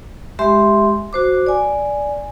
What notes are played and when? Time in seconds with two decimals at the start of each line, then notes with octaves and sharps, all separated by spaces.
0.39 G#3 G4 E5 C6
1.13 F#4 C5 D6
1.46 D5 G#5